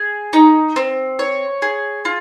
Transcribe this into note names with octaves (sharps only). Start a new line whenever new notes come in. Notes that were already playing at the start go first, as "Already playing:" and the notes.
Already playing: G#4
D#4
C4
C#5
G#4
F4